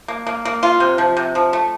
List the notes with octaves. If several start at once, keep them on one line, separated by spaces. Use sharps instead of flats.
A#3
A#3
A#3
F4
C3
F3
C3
F3
A3